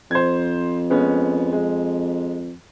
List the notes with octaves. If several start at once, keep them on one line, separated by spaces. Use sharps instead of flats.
F2 C5 G#6
G#3 B3 C#4
G#3